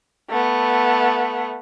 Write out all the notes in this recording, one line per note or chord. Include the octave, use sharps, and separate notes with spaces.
A3 B3